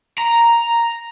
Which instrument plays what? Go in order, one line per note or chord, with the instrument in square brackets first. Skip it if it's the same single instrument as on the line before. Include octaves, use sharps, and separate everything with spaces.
[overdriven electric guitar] A#5